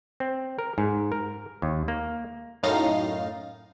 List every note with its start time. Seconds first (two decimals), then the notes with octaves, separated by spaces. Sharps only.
0.20 C4
0.59 A#4
0.78 G#2
1.12 A#4
1.62 D#2
1.88 A#3
2.63 F#2 A2 D#4 F5 A6 A#6